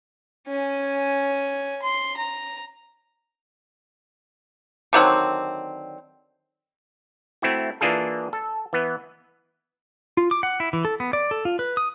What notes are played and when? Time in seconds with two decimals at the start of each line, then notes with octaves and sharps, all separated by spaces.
0.48 C#4 G#5
1.82 C6
2.16 A#5
4.93 D3 D#3 F#3 C4
7.42 A3 C4 E4 F#4
7.81 E3 A#3 D4 F4 G#4 A4
8.33 A4
8.73 E3 B3
10.17 F4
10.31 D6
10.43 F#5
10.60 E4
10.73 E3
10.85 A4
11.00 B3
11.13 D5
11.31 A4
11.45 F4
11.59 B4
11.77 D#6